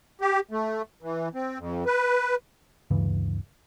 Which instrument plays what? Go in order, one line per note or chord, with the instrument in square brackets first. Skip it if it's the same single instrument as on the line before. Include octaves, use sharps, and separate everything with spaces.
[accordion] G4
A3
E3
C4
F2
B4
[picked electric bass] D2 G2 C#3 E3